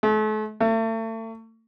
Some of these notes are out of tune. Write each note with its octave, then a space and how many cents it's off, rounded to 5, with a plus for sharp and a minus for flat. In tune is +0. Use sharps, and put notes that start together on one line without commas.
A3 -40
A3 +35